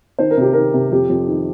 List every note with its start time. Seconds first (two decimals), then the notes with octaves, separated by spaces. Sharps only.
0.19 D#3 C5
0.30 A#4
0.37 C3 G4
0.53 D#3 A#4
0.74 C3
0.92 F2 G4
1.09 F2
1.28 D#3